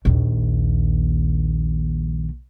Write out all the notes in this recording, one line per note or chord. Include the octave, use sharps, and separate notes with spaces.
A#1 D#2